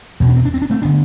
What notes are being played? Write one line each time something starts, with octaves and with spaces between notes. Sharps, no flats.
E2 B2 C4
D4
C4
D4
C4
D4
A3 C4
D3 B3 D4